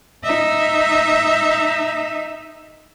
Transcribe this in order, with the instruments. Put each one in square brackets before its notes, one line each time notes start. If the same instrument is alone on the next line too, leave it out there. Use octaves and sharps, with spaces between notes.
[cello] D#4 E5